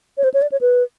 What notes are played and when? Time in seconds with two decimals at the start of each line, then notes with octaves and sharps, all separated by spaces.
0.18 C#5
0.24 C5
0.34 C#5
0.42 D5
0.52 C#5
0.61 B4